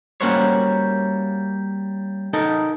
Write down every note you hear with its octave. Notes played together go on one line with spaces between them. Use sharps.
G3 A#3 C#4 F#4 C5 C#5
D#4 A4 A#4